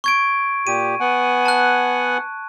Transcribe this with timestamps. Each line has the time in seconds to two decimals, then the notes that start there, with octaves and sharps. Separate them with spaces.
0.04 C#6 G#6 D7
0.67 A#2 G4 D#7
1.00 B3 F#5 G#5
1.45 A5 F#6